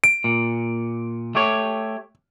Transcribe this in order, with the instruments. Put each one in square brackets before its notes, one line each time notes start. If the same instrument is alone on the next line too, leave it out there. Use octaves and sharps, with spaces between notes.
[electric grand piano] D7
[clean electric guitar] A#2
A3 G4 C#5